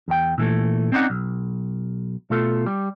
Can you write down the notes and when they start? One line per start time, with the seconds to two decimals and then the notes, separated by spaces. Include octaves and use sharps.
0.08 E2 G5
0.38 A#2 E3 A3
0.92 C4 C#4 D#4 D5 F#5
1.10 B1
2.30 B2 A3 F4 A4
2.66 G3